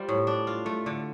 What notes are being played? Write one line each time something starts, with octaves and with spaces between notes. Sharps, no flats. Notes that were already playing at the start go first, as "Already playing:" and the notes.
Already playing: G3 F4 C5
A2
D4
F4
A3
D3